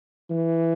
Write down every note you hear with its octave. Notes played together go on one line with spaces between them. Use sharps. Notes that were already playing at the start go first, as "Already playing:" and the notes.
E3